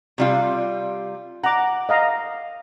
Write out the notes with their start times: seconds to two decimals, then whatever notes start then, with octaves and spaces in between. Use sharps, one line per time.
0.18 C3 G3 F4
1.44 F#5 A#5 D6
1.89 D#5 F5 A#5